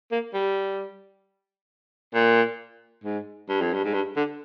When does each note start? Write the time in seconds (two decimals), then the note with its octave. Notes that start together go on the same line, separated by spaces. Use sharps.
0.12 A#3
0.34 G3
2.14 A#2
3.04 G#2
3.49 G2
3.61 F2
3.73 G2
3.84 G#2
3.94 G2
4.16 D3